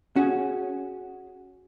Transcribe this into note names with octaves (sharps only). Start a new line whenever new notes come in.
C#4 F#4 G#4